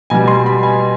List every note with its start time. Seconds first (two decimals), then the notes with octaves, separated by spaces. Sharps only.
0.10 B2 G3 G#5
0.28 C6
0.46 B5
0.63 G#5